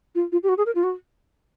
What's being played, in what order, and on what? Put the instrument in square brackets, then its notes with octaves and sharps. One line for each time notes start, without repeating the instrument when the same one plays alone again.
[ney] F4
F4
G4
F#4
G#4
A#4
F4
F#4